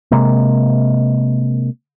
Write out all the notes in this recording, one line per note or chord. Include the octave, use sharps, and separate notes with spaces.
C3 G#3 A#3